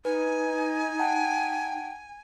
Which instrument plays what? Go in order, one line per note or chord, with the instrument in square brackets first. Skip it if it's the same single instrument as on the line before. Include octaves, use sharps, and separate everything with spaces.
[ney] D#4 [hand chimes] B4 [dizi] G#5
[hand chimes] F#5 A5 [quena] G5